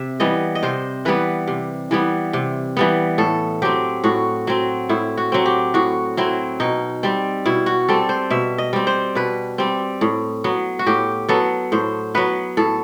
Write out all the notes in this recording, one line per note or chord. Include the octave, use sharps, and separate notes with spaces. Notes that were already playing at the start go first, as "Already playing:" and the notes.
Already playing: C3 E5
E3 G3 B3 D#5
D#5
C3 C5
E3 G3 B3 B4
C3
E3 G3 B3
C3
E3 G3 B3
A2 A4
F#3 C4 G4
A2 F#4
F#3 C4
A2 E4
F#4
F#3 C4
G4
A2 F#4
F#3 C4 E4
B2 D#4
G3 C4
B2 E4
F#4
G3 C4 A4
C5
B2 E5
D#5
G3 C4
C5
B2 B4
G3 C4
A2
F#3 B3
F#4
A2 G4
F#3 B3 A4
A2 C5
F#3 B3 B4
A2 A4